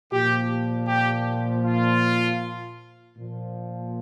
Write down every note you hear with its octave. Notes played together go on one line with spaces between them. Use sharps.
A#2 F3 G4
G4
F4
A#2 F3